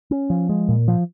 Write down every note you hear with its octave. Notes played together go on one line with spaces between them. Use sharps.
C#4
F3
G#3
A#2
F3